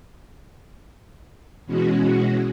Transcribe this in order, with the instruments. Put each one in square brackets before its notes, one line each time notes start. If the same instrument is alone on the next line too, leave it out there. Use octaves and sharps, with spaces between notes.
[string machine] B2 E3 G#3 C#4 F#4